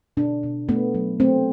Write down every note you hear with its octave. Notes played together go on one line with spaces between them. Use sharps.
B2 D4
B2
A3 B3
F#3
A3 C4